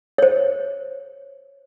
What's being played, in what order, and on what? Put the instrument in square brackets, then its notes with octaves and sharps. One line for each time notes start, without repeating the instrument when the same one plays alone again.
[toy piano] C5 C#5